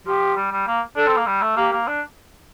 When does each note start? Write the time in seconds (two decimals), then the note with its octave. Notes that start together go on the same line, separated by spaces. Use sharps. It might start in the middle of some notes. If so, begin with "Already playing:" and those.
0.06 F3 G4
0.36 G3
0.52 G3
0.67 A#3
0.96 D4 A4
1.07 C4
1.16 A#3
1.26 G3
1.42 A3
1.57 A#3 G4
1.72 A#3
1.87 D4